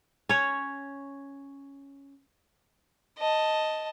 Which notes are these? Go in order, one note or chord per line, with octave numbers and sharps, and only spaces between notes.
C#4 C#5
D#5 A5